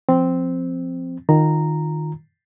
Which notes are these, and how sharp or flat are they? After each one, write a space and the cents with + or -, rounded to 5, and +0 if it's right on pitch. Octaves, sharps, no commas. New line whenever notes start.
F3 +0 C4 -5
D#3 -10 F4 +15 A#5 -5